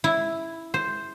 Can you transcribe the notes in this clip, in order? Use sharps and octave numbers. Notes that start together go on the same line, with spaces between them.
E4
C5